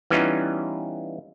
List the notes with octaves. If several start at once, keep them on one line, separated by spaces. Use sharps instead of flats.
E3 G3 B3 C#4 D#4 F4